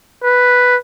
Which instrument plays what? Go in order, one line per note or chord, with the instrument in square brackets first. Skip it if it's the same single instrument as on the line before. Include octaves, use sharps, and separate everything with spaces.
[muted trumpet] B4